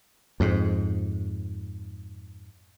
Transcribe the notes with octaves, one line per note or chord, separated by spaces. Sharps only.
F2 G#2